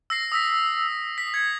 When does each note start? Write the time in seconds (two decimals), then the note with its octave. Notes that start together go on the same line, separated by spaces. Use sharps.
0.10 E6 A#6 C7
0.32 D#6 E6 A#6 B6
1.18 D#6 B6
1.34 G#6 C#7